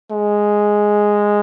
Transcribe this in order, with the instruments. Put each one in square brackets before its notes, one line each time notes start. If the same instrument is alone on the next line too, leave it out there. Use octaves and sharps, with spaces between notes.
[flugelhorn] G#3